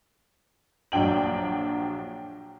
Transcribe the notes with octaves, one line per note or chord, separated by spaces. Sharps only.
A#1 F#3 D4 G5 F#7